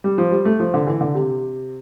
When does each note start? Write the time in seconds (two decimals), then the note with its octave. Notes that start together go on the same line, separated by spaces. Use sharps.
0.04 G3
0.18 F3
0.31 G3
0.45 A3
0.60 F3
0.74 D3
0.87 E3
1.01 D3
1.14 C3